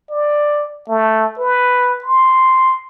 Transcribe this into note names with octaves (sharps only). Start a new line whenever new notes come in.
D5
A3
B4
C6